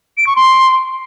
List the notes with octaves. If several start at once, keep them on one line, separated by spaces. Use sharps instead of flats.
D7
C#6
C6